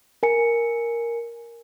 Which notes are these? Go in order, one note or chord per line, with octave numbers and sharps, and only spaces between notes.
A#4 G#5 C#7